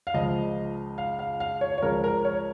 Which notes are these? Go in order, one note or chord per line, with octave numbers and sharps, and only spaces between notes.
F5
C#2 C#3 F3 D#5
F5
F5
F5
C#5
C#5
C#2 C#3 F3 A#4
A#4
C#5